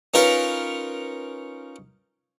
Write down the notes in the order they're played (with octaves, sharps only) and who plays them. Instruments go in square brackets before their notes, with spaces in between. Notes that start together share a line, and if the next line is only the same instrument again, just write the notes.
[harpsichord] C#4 D#4 F4 A#4 B4 C#5